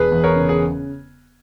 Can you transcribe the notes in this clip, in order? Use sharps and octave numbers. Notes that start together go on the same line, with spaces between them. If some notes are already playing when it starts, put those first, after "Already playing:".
Already playing: E1 G#4 B4
E2
A#4 C#5
C#3
G#4